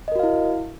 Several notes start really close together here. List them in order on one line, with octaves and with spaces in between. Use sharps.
D#5 A#4 F#4 F5 E4